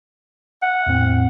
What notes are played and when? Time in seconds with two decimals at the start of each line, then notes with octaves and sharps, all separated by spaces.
0.62 F#5
0.87 E2 A2 C4